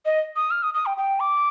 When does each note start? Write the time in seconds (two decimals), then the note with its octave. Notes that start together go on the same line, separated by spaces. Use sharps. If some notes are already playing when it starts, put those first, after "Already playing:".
0.05 D#5
0.36 D#6
0.51 F6
0.63 D#6
0.74 D#6
0.86 G5
0.97 G5
1.20 D6